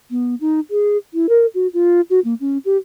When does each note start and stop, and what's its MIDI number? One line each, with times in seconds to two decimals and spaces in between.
0.11 0.35 59
0.41 0.60 63
0.71 0.97 68
1.14 1.27 64
1.29 1.46 70
1.54 1.67 66
1.74 2.01 65
2.10 2.20 66
2.25 2.34 58
2.41 2.58 61
2.65 2.77 67